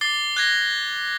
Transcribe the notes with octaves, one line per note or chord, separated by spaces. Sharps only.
D6 A6 C7 G7
F#6 G#6 A#6 G7